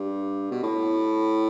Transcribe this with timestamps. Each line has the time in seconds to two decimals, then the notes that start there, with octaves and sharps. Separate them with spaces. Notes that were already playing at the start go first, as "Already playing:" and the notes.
Already playing: G2
0.51 B2
0.63 A2